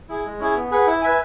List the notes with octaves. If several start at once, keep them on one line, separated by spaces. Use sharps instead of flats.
E4 G#4
G#3
C#4 E4 G#4
B3
G#4 B4 F#5
E4
B4 E5 G#5